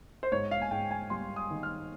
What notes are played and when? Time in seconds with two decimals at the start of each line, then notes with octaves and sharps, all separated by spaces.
0.23 C5
0.32 G#2 C#5
0.51 F5
0.62 G#5
0.71 G#2 G5
0.91 G#5
1.10 G3 C6
1.36 D#6
1.50 D#3
1.63 F6